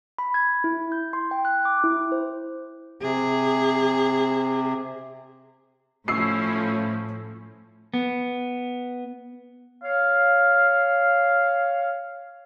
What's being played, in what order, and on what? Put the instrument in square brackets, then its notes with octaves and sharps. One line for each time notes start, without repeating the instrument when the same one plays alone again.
[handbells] B5
G#6
E4
G6
C6
G5
F#6
D6
E4
C5
[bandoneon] C3 [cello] G#4
[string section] A2 [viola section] F3 C#4 E4 [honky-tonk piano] C#6 E6 C7
[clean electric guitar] B3
[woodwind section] C#5 F5